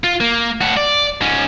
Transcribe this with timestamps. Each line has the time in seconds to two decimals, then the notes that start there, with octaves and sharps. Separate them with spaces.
0.04 F4
0.21 A#3
0.61 A2 F#4
0.77 D5
1.21 G#2 C#4